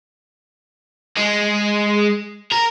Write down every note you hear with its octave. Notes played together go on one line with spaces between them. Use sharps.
G#3
A#4